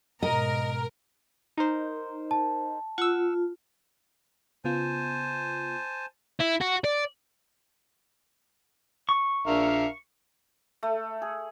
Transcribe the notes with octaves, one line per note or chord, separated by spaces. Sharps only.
G#2 B2 A#4 D#5
D#4 A#4 C5
A5
F4 F#5 E6
C#3 B3 F4 C5 G#5 A5
E4
F#4
D5
C#6
A#1 D4 A#4 E5 F5
A3
G#4